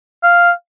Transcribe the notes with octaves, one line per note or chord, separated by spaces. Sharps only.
F5